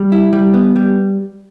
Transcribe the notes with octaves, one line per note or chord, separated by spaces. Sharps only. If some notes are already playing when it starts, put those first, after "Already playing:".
Already playing: G3
E4
G3
B3
G3